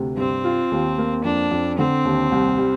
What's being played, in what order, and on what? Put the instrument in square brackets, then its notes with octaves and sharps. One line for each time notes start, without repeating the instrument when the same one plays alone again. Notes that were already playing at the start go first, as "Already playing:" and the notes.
Already playing: [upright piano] D2 C3
[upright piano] G2 [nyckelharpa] C4
[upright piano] F4
D#2
A#3
[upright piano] F2 [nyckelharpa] D4
[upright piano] F2
[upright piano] D3 [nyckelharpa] C4
[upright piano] D#2
C2
G3